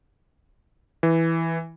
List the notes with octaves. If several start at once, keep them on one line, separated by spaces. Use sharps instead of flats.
E3